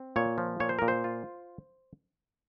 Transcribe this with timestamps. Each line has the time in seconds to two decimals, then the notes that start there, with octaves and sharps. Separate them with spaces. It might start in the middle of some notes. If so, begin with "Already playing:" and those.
Already playing: C4
0.16 A#2 C#5
0.38 F3
0.60 A#2 C#5
0.69 C5
0.79 A#2 A#4
0.88 C5
1.04 F4